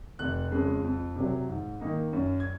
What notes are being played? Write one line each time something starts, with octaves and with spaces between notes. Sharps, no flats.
F1 F#6
F2 C#3 G#3
F2
C3 F#3
G#2
D#3 A#3 D#4
F#2
G#6